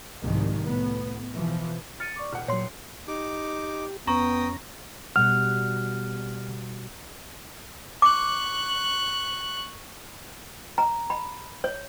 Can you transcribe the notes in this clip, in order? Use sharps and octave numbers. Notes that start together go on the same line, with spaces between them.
C2 G#2 D#3 F3
A2 B3
B2 E3 F3
F6 A6 C#7 D#7
D5 C#6 D6
D#1 F#5 F6
A#2 F#3 C#5 C6 C7
D#4 G4 D6
F2 B3 C#4 G5 A#5 C#6 D#6 A#6
B2 G3 F#5 F6
C#6 D6 F#6
A#5
B5
C#5